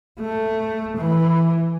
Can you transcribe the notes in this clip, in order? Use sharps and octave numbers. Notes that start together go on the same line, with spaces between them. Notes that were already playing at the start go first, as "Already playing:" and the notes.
A3
E3